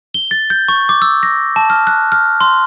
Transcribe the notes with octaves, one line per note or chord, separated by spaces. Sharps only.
G7
A6
G6
C#6
D6
E6
A#6
A5
F6
F#6
F6
C6